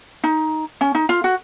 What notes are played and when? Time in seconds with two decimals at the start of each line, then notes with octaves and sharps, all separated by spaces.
0.24 D#4
0.81 C#4
0.95 D#4
1.09 F4
1.24 F#4